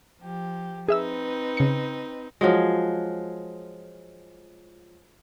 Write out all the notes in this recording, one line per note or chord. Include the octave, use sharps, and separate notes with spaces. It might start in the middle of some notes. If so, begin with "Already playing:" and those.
F3 G4
C4 D#4 G#4 B4 E5 E6
C#3 C#7
F3 F#3 G#3